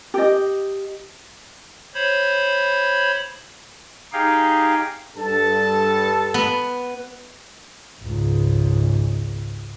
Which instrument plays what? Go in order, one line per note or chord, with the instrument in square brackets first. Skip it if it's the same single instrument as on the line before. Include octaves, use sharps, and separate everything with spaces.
[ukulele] G4 D#5
[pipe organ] C5 C#5 B5
D#4 G4 G#4 F5 G5
[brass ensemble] G2 A4 A5
[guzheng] B3
[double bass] G#1 C#2